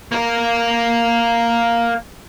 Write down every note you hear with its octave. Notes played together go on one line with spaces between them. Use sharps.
A#3 A#4